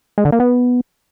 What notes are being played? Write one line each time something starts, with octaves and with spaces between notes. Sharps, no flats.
G#3
D3
A#3
B3